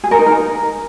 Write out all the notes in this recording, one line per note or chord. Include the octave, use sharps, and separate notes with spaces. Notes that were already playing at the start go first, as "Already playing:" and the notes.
G#4
A#4
D#4
A#4